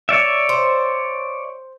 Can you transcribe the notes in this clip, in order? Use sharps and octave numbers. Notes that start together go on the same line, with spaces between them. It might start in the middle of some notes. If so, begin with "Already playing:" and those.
C#5 D5 E5
C5